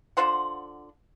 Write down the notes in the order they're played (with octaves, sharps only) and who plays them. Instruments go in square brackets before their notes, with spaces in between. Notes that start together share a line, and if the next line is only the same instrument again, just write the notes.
[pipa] D3 F4 C5 F#5